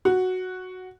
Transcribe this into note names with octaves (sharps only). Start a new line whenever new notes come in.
F#4